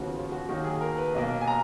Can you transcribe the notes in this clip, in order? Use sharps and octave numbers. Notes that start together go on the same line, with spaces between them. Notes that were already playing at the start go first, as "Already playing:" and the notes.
Already playing: D#2 C#3 F3 B3 F#4
F4
F#4
D#2 D#3 F#3 A#3 F#4
G#4
A#4
B4
B1 B2 A#3 D#5
G#5
A#5